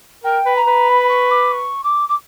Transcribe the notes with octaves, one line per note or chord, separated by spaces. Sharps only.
A#4 G5
B4
A#5
B4
B5
C#6
D6
C#6
D6
D6